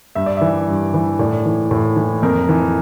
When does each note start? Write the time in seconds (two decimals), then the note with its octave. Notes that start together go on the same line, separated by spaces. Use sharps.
0.15 G2 E5
0.26 D5
0.37 E3 E5
0.68 G2
0.94 E3
1.19 A2 D5
1.46 E3
1.71 A2
1.96 E3
2.23 F2 A#4
2.49 E3